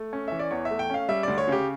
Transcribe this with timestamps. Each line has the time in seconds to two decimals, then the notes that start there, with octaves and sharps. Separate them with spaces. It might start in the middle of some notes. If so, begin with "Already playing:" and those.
Already playing: A3
0.13 C#4
0.28 E3 E5
0.39 D5
0.51 E2 C#5
0.65 E5
0.71 A3
0.79 G5
0.90 C#4 F5
1.09 G3 E5
1.23 D2 D5
1.38 C#5
1.48 C#3 G4